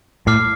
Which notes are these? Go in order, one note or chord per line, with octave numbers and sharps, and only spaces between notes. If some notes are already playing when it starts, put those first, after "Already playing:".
A2 D6 F6 C7